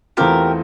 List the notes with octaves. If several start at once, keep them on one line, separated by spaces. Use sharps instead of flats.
E2 E3 A3 C4 F4 G4 A#4